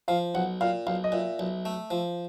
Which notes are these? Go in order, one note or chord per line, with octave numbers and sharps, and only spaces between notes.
F3 F5
B1 F#5
A#2 F5
B1 F5
D#5
A#2 E5
B1
A3
F3